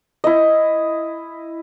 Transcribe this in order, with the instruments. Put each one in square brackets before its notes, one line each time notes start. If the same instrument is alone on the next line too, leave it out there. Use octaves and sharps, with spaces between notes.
[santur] E4 D#5